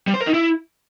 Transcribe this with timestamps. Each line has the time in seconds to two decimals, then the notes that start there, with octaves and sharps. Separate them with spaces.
0.07 G3
0.14 C5
0.20 A#4
0.27 D#4
0.34 E4